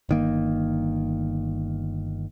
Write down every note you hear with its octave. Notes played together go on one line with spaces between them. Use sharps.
G1 D#3 A#3